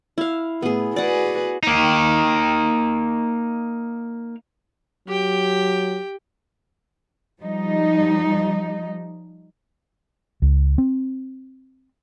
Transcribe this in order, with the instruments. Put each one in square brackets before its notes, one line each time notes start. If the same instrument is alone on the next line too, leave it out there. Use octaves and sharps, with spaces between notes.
[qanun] E4 F5
[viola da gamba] A2 [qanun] B3 G#4
[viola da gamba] F#4 G#4 B4 [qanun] D5 F#5
[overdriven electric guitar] A#3 D#4
[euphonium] F#3 [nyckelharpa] G4 G5
[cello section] F3 G3 D#4
[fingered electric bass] C#2
C4